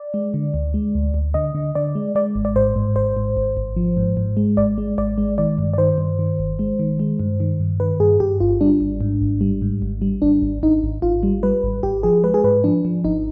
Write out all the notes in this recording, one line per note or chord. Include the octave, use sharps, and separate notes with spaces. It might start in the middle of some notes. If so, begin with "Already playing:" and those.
Already playing: D5
G#3
D3
D2
G#3
D2
D2
D3 D#5
D3
D3 D5
G#3
G#3 D5
G#1
D5
G#2 C5
G#2
G#1 C5
G#2
G#1
G#1
F3
G#2
G#2
G#3
G#1 D5
G#3
G#1 D5
G#3
D#3 D5
G2
D5
D#3 C5
G2
D#3
G1
G#3
D#3
G#3
G2
D#3
G2
D#3 B4
G2 G#4
G2 G4
G1 F4
G3 D4
G#1
G#2
G#1
G3
G#2
G#1
G3
G#1 D4
G#1
G#1 D#4
G#1
G#1 F4
G3
G3 B4
G#1
G#1 G4
F3 G#4
G#3 B4
G#4
G#2 B4
F3 D4
F3
G#1 D#4